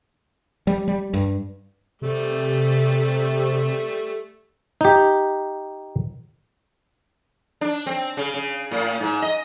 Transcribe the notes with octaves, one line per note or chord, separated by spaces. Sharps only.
G3
G3
G2
C3 G3 A3
D#4 G4
D4
C4
C#3
C#3
A2
G#2
D#5